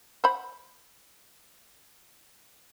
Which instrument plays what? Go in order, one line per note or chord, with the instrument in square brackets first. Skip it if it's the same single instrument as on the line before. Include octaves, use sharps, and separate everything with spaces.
[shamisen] C5 F#5 B5